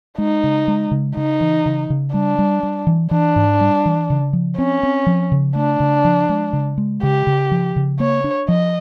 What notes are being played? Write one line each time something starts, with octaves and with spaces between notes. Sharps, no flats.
G#3 D#4
C#3
G#3
C#3
C#3 D#4
E3
C#3
C#3
G3 D4
G3
G3
E3
E3 D4
G#2
G3
E3
C#3
F3
C4 C#4
C4
F3
C#3
A3 D4
C#3
F3
G#3
C#3
G#3
C#3 G4
C#3
F3
C#3
A#3 C#5
D4
F3 D#5